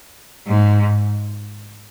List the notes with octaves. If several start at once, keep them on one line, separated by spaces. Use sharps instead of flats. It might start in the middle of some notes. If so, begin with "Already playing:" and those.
G#2